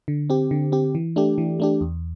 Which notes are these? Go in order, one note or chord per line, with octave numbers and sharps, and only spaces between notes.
D3
C4 G4
D3
C4 G4
E3
A3 D4 G4
E3
A3 D4 G4
E2